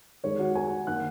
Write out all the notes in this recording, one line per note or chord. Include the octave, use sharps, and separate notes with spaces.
D#3 G#3 C#5
F#4 F#5
G#4 G#5
D#3 A#3 F#5 F#6